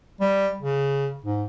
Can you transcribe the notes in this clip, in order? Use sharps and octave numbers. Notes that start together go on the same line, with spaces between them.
G3
C#3
G#2